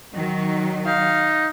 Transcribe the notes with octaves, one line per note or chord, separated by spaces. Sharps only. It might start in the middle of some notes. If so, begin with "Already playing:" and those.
D#3 F#3
D#4 F5